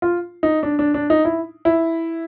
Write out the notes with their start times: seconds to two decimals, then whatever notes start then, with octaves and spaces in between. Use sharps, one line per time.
0.02 F4
0.43 D#4
0.63 D4
0.79 D4
0.94 D4
1.10 D#4
1.25 E4
1.65 E4